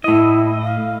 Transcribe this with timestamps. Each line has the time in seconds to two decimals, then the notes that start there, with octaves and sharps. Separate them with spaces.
0.04 A2 E4 D#5
0.63 F5